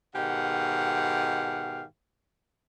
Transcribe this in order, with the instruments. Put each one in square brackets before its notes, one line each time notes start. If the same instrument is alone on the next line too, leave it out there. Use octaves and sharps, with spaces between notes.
[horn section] G#2 B2 D#3 G4 F5 F#5